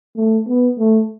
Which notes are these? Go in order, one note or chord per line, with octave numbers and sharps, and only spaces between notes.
A3
B3
A3